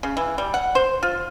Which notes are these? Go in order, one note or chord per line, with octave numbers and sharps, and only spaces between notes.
C#3
E3
G3
F#5
C5
F4